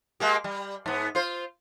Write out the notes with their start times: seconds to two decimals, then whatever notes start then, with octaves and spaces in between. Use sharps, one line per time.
0.20 G#3 A#3 G4
0.44 G3
0.86 G#2 B3
1.15 F4 C5